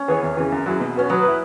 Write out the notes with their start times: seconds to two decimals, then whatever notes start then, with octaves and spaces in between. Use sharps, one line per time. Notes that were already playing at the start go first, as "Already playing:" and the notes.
Already playing: C#4
0.08 E3 B3 G#4 C#5
0.23 E2
0.37 C#3 E3
0.52 F#2
0.66 F#3 E4 G#4
0.80 B2
0.95 B3 C#4 F#4
1.09 F#3 B3
1.23 E4 B4